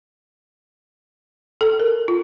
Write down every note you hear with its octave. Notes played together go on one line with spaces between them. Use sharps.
A4
A#4
F4